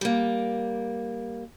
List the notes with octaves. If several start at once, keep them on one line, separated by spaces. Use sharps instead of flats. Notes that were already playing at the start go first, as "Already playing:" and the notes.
G3 A#3